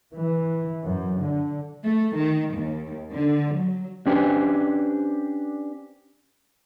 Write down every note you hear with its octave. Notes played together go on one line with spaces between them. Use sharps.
E3
F#2
D3
A3
D#3
D#2
D3
F#3
C#4 D4 G4 B4 C5